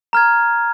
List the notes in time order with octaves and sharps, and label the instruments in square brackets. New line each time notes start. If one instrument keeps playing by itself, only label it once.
[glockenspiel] A#5 F6 G#6